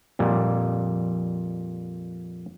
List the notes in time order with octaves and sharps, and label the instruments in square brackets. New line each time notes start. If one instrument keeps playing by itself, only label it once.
[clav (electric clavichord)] F2 A#2 G3